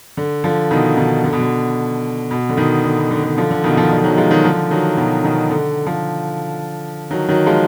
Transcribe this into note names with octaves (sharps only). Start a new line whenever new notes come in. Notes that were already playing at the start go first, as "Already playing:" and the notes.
D3
D3 F3
B2 D#3
B2 D#3
D3
B2
D3
B2
D3
B2 D#3
D3
B2
D3
D3
D3 F3
D3
B2 D#3
D3 F3
D3
F3
D#3 F#3
F3 G#3
D#3 F#3
D3 F3
D#3 F#3
B2 D#3
B2 D#3
D3
D3 F3
D#3 F#3
D#3 F#3
F3 G#3